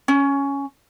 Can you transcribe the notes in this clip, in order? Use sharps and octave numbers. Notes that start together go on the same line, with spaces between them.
C#4